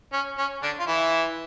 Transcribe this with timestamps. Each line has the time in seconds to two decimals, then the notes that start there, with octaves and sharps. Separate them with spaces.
0.13 C#4
0.38 C#4
0.63 D3 D4
0.80 F4
0.87 E3 E4